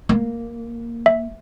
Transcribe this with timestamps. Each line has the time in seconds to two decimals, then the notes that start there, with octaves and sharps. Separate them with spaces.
0.09 A#3
1.06 E5